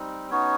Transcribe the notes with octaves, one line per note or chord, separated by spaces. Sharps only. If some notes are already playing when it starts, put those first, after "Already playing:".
Already playing: G3 C4 D#4
B3 C#4 D#4 F#4 C#5